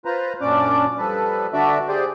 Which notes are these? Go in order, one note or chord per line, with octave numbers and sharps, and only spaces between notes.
F4 B4 C5 A#5
F#2 A#2 C#4 D4 D5 D6
F3 G3 A4 B4
D3 D4 F#4 D5 E5
G4 G#4 C5 D5